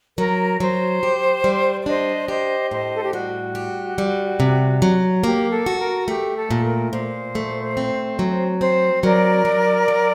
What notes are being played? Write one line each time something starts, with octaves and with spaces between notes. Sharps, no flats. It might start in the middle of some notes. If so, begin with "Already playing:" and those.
F#3 A#4
F#3 C5
G4
G3
D5
D4 C5 D#5
G4 C5 D#5
A2 C5 D#5
A4
G4
G3 F#4
G4
G3
C3
F#3
A#3 G4
A4
F#4
A#4
A3 G4
A4
A#2
A#4
A#2 C5
A3
C4
F#3
C4 C5
F#3 A#4 D5
F#3
F#3